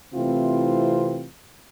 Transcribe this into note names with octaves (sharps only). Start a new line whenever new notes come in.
C3 E3 A3 C4 E4 F4